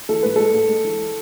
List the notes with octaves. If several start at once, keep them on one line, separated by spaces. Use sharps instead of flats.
E3 A4
G#2 B4
G#3 A4
G#2
G#3
E3